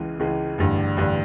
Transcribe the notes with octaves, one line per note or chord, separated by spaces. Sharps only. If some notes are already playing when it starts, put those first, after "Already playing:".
Already playing: C#2 C#3 E3 G#3
C#2 C#3 E3 G#3
A1 G2 D3
A1 G2 D3